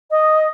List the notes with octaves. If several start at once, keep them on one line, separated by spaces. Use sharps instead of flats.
D#5